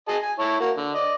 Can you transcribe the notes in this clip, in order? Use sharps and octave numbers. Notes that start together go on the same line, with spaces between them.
G#4 D#5 A5
G#5
E4 C#5 A5
A#3 F#4
D3
D5 D#5